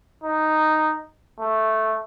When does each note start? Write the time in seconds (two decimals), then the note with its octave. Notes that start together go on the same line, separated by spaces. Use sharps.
0.24 D#4
1.40 A3